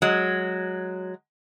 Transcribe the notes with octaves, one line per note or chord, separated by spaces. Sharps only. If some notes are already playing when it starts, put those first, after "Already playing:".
F#3 G#3